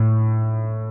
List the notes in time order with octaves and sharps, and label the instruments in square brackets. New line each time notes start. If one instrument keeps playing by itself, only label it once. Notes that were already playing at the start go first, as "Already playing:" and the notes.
Already playing: [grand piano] A2